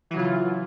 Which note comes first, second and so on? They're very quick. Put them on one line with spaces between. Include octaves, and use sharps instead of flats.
E3 F#3 C#3 F4